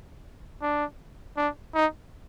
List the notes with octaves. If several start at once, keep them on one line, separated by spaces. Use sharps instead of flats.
D4
D4
D#4